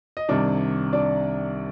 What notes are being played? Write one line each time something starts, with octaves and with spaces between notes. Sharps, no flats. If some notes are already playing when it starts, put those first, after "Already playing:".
D#5
C2 C3 D#3 D4 D5
D4 D5